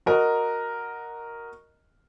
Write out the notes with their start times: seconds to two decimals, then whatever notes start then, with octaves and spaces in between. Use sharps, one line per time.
0.06 F#4 A#4 D#5 A#5